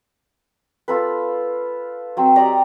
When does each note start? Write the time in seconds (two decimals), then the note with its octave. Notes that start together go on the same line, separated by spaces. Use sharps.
0.88 F4 A4 B4
2.17 F#3 C4
2.36 G4 D5 D#5 A#5